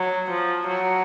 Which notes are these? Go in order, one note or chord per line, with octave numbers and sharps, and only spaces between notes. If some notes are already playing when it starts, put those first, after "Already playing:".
Already playing: F#3
F3
F#3